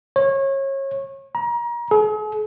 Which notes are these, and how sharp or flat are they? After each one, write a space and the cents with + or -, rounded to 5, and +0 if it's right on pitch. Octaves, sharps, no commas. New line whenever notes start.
C#5 -25
A#5 +30
G#4 +45